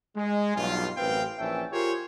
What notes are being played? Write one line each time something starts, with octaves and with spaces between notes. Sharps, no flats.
G#3
B1 G2 F4
A1 F#2 C4 B4 F5 G5
A#1 E3 C#4 E5 G5 A5
F4 G4 G#4 A#4 C5 C#5